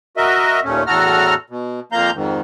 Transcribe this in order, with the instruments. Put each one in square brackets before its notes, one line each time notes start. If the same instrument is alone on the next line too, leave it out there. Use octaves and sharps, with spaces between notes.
[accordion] F#4 A#4 D#5 E5
D#2 A#2 A3 C#4
E2 A2 F#4 A4 A#5 F6
B2
F2 F3 A#3 F5 A#5 G6
F2 G#2 D#3